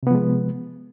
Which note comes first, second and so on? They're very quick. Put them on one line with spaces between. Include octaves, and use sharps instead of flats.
C3 B3 F3 G#3